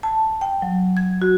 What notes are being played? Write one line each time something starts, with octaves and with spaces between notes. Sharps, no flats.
A5
G5
F#3
G#6
F#4